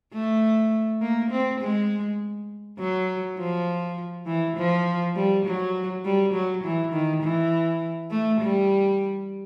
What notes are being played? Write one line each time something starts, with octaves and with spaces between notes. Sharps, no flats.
A3
A#3
C4
G#3
F#3
F3
E3
F3
G3
F#3
G3
F#3
E3
D#3
E3
A3
G3